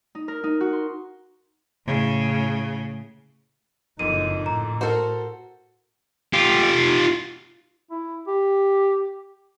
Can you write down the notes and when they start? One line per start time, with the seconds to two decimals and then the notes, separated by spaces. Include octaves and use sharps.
0.15 D#4
0.28 A#4
0.43 D#4
0.60 F#4
0.73 C6
1.86 A2 C#3
3.99 F#1 F2 A#2 D3 D#4 D#7
4.46 A2 A#5
4.81 F#4 A4 A#4 C5
6.33 F4 G4
7.91 E4
8.27 G4